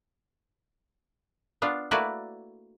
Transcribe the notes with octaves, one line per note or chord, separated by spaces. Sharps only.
B3 D4 F4
A3 A#3 E4 F#4 B4 D5